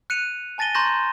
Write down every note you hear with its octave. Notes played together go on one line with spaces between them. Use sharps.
F#6 C#7 D#7 F7
G#5 A5 A6 A#6 D#7 G7
A#5 C6 C#6 G6 A#6 E7